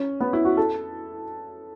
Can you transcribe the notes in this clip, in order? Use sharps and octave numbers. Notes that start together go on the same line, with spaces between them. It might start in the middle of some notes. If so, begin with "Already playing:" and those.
Already playing: C#4
B3
E4
F#4
A4